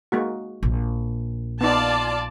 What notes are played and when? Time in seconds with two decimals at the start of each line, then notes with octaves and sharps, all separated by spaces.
0.12 G#3 A#3 F#4
0.63 A#1
1.61 B3 D#4 F4 D5 A5